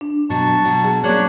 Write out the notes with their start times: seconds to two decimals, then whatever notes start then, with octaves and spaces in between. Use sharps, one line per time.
0.01 D4
0.30 B2 F#3 A5 C#6
0.65 B2 F#3
0.84 G#4
1.04 F#3 A#3 C#4 D4 C#5 F#6